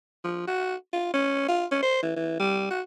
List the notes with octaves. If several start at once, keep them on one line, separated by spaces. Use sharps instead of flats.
F3
F#4
F4
C#4
F4
C#4
C5
E3
E3
G3
F#4